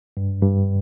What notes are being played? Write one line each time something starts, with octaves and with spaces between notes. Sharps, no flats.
G2
G2